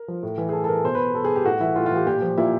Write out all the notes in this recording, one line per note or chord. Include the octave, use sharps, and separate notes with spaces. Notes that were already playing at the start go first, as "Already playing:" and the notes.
Already playing: A#4
F3
A2
E3
G#4
A2 A4
A4
E3 A#4
B2 C5
B4
B2 A4
G#4
G4
A2 F#4
E3 E4
A2 F4
F4
E3 G4
A#2 G4
F3
A#2 E4